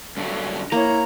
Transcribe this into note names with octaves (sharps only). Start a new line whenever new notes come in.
G2 D3 F#3
A#3 E4 C#5 A#5